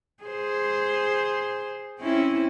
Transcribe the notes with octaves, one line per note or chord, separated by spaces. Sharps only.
G#4 C5
C4 C#4 E4